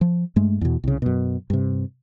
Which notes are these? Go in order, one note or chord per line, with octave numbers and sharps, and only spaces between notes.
F3
G2 G#3 A3
E2 B2
C2 C#3
F#2 B2
G2 C3